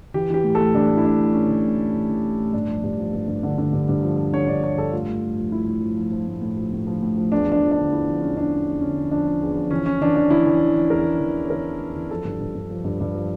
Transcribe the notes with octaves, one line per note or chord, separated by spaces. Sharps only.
E3 G4
E3 G4
A2
A2 A4
E3 D4
A2
E4
A2 D4
A2
A2 C#4
E3
A2
A2
E3
E3
A2
A2
G2 D4
F3
G2
F3
G2
G2
D3
D3
G2
G2
F3
F3
D3 C#5
G2 D5
G2 C#5
G2 A4
A2 F4
A2
A2
F3
A2 E4
A2
F3
F3
F3
A2
A2
F3
A2
F3
A2
F3
E2 D4
F3
D4
F3
D4
D3
E2 E4
F3
E2 C#4
E2 D4
E2 C#4
E2
D3 C#4
F3
F3 D4
F3
E2
F3
E3 C#4
E3 C#4
E3 D4
E3 D4
E3 E4
E3
E3
E3
E2 A#4
E2
E3
E2
C#5
E3 A#4
E2
E2
E3
F3 A4
G2
G2
G2
F3
G2
G2
F3